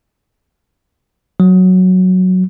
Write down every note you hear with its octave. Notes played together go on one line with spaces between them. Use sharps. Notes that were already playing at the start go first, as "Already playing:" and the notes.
F#3